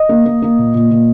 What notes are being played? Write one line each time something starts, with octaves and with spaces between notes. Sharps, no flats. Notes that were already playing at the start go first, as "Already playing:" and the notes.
Already playing: D#5
A#3
A#3
A#3
A#2
A#2
A#2